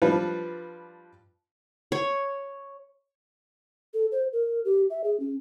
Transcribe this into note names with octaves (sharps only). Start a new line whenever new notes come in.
F3 G3 D4 F4 B4
C#5
A4
C5
A#4
G4
E5
G#4
C#4